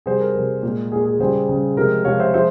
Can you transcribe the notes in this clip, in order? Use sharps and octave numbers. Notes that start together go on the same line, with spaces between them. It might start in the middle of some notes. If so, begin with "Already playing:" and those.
C3 G3 G#4 C5
A#4
C3 G3 A#4
A#2 G#3
A#2 G#3 G#4
G#4
C#3 G3 G#4 C5
C#3 G3
C3 F3 G#3 A#4
C3 F3 G#3 C#5 F5
C5 E5
F3 G#3 C5 E5